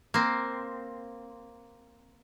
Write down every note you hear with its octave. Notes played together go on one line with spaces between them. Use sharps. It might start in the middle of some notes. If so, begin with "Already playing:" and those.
A#3 C4